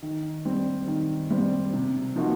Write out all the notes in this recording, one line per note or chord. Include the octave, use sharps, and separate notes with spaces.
D#3
G3 C4
D#3
G3 C4
C3
F3 A#3 D#4 F#4